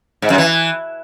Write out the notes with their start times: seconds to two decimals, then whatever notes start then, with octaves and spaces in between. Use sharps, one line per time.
0.22 G#2
0.30 F#2
0.38 E3